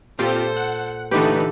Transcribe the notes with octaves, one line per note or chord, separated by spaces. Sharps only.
A#2 C4 F4 G4 A4 C5
F#5
A#2 D3 E3 A3 D#4 G4 A4 B4